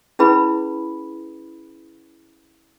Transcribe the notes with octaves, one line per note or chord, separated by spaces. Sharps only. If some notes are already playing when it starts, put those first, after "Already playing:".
C#4 E4 G#4 B4 B5